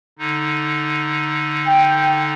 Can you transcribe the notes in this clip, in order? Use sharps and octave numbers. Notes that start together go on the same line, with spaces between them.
D3 D#4
G5